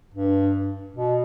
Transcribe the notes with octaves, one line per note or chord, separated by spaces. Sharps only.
G2
B2